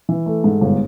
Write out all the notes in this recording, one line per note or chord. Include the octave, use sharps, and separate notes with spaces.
E3
A3
G#2
G1